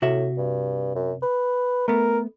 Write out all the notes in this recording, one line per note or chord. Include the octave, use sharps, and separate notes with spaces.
A2 C3 F#4 E5
G2
F#2
B4
A3 B3 A#4